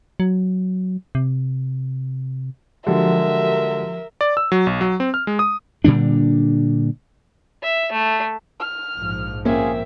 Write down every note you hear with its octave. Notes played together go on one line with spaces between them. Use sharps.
F#3
C3
D3 F3 F#3 G#3 G4 A#4 E5
D5
E6
F#3
B1
F#3
C4
F6
G#3
D#6
A#2 D3 G3 D4
E5
A3
F6
A#1 G#2 F3
A#3 C4 C#4 F4 G#4 E5